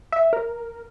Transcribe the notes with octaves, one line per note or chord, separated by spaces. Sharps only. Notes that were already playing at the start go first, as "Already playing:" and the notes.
E5
A#4